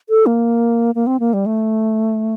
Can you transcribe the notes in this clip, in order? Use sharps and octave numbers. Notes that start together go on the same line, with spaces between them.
A4
A#3
A#3
C4
A#3
G3
A3